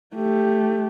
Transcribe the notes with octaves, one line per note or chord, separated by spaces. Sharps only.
A3 G4